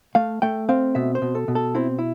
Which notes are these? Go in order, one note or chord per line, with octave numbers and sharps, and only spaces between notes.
A3 F5
A3 G5
C4 F5
B2 E5
C5
B2
A4
B2
A4
C4 E4
E4